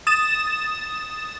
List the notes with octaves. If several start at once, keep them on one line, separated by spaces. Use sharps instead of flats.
D#6 A6 E7